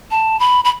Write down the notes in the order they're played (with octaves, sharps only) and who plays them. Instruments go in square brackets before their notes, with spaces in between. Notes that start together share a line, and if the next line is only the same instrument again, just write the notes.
[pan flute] A5
B5
B5